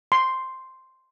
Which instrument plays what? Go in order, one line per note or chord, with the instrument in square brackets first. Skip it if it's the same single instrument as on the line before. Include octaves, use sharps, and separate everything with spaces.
[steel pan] C6